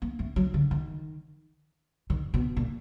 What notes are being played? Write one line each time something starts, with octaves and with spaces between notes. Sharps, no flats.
A#3
A3
F#3
D3
D#3
D#3
B2
A#2